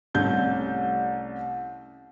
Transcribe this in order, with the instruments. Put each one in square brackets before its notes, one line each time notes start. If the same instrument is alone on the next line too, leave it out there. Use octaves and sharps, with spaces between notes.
[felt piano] C2 G3 A3 C#4 G6